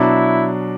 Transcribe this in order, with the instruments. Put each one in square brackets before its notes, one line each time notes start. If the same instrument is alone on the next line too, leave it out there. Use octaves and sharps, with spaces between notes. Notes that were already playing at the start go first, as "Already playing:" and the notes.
Already playing: [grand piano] B2 F#3 D4 [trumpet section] E4